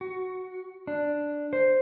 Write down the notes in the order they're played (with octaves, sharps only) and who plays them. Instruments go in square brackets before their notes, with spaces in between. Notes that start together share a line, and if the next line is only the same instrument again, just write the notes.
[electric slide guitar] F#4
D4
C5